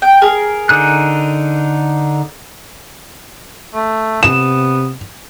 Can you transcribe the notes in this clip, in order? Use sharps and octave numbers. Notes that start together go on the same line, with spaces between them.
G5
G#4 A#4
D3 D#4 F#6
A3
C3 B3 E7